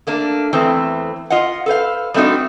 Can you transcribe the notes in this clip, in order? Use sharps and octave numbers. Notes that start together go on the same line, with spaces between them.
A3 A#3 D4
E2 E3 A3 C4
F4 D#5 F5 F#5
A4 B4 C5 F5
G3 A3 C4 D4 D#4 F#4